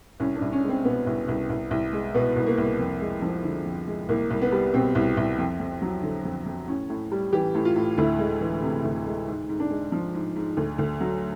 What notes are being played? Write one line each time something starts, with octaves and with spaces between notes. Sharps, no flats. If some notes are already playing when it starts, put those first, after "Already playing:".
C2 C#4
D4
C2
C#4
G#3
C4
B2 B3
C2
C2
C2
C2
G#3
B2 B3
C2
A#3
C2
F2
G#3
F3
D3
F2
G#3
C2 A#3
C2
B3
G3
B2 C4
C2
C2
F2
F2
F#3
D3
F2
F2
A2 C#4
A2
G3
E3 G4
A2
F4
A2
D2 E4
G#3
E3
C3
D2
G#3
G#2
G#2
D4
G#3
F3
G#2
G#2
D2
D2
F#3